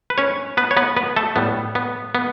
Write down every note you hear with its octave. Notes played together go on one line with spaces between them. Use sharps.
B4
C#4 C#5
B3 B4
C#5
B3 B4
B3 B4
A3 A4
A2 G3 B3
B3
B3